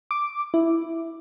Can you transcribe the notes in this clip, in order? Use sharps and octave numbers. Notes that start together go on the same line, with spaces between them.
D6
E4